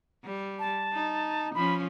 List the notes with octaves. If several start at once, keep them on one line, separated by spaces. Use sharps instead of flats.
G3
A5
D#4
F3 C#4 B5